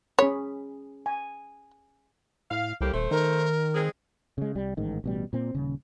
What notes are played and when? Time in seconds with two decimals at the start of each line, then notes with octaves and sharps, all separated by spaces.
0.19 C#4 G#4 C#5 B5
1.06 G#5
2.51 A2 F5
2.81 C2 A2 A#3 G4
2.94 D#1 A3 C5
3.11 D#3 A#4
3.75 G#3 C4 G#4
4.38 C#3 G#3
4.55 C2 G3
4.77 A1 G#2 D#3
5.04 A1 B2 G3
5.33 A#2 C4
5.55 D#1 C#3